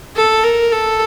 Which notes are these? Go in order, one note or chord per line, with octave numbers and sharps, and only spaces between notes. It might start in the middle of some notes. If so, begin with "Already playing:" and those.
A4
A#4
A4